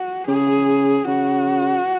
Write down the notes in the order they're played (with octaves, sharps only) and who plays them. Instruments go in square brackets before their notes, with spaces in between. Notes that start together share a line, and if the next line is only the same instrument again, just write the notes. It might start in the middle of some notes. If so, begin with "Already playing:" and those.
Already playing: [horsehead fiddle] F#4
[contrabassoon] C#3 [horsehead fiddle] G#4
[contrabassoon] C#3 [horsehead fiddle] F#4